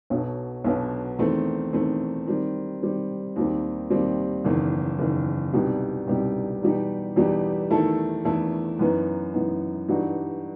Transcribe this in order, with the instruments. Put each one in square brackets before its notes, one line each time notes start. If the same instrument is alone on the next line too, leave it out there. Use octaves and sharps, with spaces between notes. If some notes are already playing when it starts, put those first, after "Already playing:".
[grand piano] B1 B2 F#3
B1 B2 F#3
E2 D#3 A3 C4
E2 D#3 A3 C4
D#3 G3 C4
D#3 G3 C4
D#2 D#3 G3 C4
D#2 D#3 G3 C4
F#1 E2 D#3
F#1 E2 D#3
C2 B2 G3 D#4 G4
C2 B2 G3 D#4 G4
E2 B2 G3 D#4 G4
E2 B2 G3 D#4 G4
E2 D#3 A3 E4 A4
E2 D#3 A3 E4 A4
F#2 E3 B3 D#4
F#2 E3 B3 D#4
G2 E3 G3 D#4 F#4